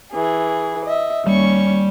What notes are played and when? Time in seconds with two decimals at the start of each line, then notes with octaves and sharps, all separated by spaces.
0.11 E3 G#4
0.84 D#5 E5
1.26 D#2 G3 C#4 C#6